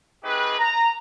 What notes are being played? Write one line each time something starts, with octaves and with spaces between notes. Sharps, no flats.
A3 C4 D#4 G4 G#4 B4
A#5